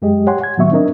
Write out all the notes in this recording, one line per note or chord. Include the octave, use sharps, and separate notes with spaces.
F#2 G#3 G4 G#4 D#5
G4 C#5 F#5 G#5 C6
F#5 G#6
A2 D#3 F#3 B3 E5 C#6
C4 D4 D#4 A#4 D#5